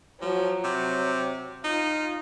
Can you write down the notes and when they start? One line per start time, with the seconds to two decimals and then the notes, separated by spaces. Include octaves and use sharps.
0.21 F3 F#3
0.64 C3
1.64 D#4 F4